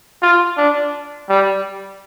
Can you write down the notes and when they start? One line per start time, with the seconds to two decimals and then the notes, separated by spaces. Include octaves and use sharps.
0.22 F4
0.57 D4
1.29 G3